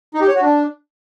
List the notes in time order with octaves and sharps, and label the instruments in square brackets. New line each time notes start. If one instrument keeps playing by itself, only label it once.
[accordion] D#4
G4
C#5
F#4
D4